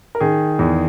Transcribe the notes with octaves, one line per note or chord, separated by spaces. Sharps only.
A#4
D#3 G#4
E2